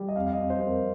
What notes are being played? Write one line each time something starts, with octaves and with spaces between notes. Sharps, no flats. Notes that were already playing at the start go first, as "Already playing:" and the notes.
Already playing: G3
D#5
F2 F5
F5
F2 D#5
C5
F2 C5
A#4